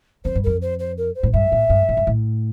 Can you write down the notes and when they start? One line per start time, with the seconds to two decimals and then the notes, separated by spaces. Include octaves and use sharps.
0.25 F2 C5
0.35 G2
0.44 F2 A#4
0.62 C5
0.79 C5
0.98 A#4
1.15 C5
1.23 A2
1.33 G2 E5
1.52 A2
1.70 G2
1.89 A2
1.97 G2
2.07 A2